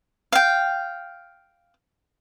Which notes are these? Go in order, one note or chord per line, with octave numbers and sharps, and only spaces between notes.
F5 G5